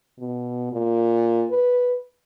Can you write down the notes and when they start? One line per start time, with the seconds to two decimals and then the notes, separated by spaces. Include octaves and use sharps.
0.19 B2
0.73 A#2
1.51 B4